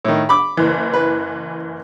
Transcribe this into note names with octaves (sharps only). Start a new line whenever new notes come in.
A2 D#3
B5 D6
F#1 E3
B4